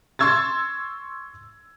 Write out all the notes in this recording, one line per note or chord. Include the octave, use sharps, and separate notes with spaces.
C6 C#6 E6 G#6 A6